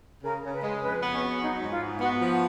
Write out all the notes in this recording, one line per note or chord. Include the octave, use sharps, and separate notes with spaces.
C#3 A#4
C#3
B4
G#3
F2 B4
B3
C#4
F#4
F#3 D#4
G#2
F4
G#2
B3 F#4
F3
F#4